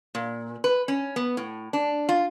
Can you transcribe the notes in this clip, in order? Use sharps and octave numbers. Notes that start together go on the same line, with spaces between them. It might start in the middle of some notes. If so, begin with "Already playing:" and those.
A#2
B4
C#4
B3
A2
D4
F4